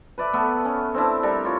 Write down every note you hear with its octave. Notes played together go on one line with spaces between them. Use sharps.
B4 D5 E5
A3 B3 B4
C#4
C4 D4 E4
G3 D4 A#4
F4 C#5